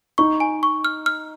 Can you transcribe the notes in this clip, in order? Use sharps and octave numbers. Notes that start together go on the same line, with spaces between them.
D#4 C#6
G#5
C#6
F6
F6